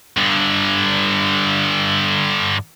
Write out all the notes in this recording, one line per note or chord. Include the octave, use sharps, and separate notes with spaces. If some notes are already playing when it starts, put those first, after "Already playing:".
G2 D3